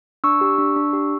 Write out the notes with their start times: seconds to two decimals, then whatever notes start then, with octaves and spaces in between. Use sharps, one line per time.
0.24 D4 C#6 E6
0.41 G4
0.58 D4
0.76 D4
0.93 G4